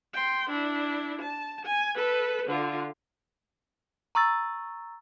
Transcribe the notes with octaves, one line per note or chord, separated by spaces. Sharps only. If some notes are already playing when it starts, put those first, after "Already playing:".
G5 C6
D4 E4
A5
G#5
A4 B4
D3 F4
A#5 C#6 E6 A6